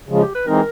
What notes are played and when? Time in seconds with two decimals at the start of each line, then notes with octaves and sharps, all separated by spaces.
0.09 C#3 F3 G#3
0.22 G4
0.35 B4
0.47 E3 G#3 C4 D#4 A#4